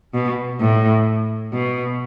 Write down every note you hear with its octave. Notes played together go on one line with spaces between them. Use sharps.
B2
A2
B2